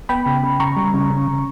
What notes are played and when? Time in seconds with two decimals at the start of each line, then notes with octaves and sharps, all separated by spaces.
0.09 B3 G5 B5
0.26 C#3
0.44 C#3
0.60 C#3 A#5 C#6
0.77 G3
0.94 C#3
1.10 C#3
1.27 C#3